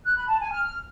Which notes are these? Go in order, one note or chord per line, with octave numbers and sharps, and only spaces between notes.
F#6
B5
A5
G#5
F6